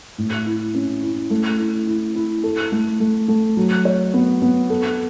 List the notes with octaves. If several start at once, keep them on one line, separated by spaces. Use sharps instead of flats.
A2
E4
C#4
E4
A3
E4
E4
E4
A4
A3
A3
A3
F#3
C#5
B3
B3
A4